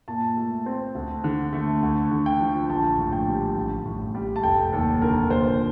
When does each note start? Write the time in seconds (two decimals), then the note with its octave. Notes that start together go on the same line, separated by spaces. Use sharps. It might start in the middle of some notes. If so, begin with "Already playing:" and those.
0.08 A#2 A5
0.37 A3
0.66 C4
0.95 D2
1.24 D3
1.53 A3
1.82 D2
2.11 D3
2.26 G5
2.40 F3
2.69 A#1 A5
2.98 A2
3.13 G5
3.27 G3
3.56 A1
3.85 A2
4.15 G3
4.36 A5
4.43 F1 G5
4.73 D#2 A4
5.02 D3 A#4
5.30 A#2 C5